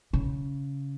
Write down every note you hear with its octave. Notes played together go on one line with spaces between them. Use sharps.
C#3